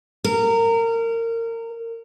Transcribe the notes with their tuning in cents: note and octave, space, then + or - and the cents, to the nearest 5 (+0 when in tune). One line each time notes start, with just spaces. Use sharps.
A#4 -25